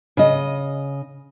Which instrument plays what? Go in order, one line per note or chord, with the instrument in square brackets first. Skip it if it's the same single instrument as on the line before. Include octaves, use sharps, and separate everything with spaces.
[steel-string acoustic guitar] C#3 D#5